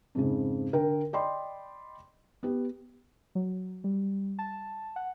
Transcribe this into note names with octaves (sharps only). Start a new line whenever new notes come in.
F2 G#2 C#3
D3 A#4 G5
D5 D#5 G5 B5 C6
B3 G4
F#3
G3
A5
F#5